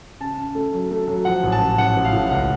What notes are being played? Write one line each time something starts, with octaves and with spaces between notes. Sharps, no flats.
C#3 A5
C#3
A3
F#3
A3
F#3
F3 F#5
A1
A5
A1
A1 F#5
A1
F5
A2
C#2 F#5